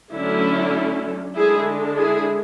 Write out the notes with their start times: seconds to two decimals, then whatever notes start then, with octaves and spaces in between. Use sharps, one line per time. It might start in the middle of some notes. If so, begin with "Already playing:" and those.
0.12 D3 F#3 A3 C#4 E4
1.35 D3 G#3 D4 E4 G#4
1.96 E4 G#4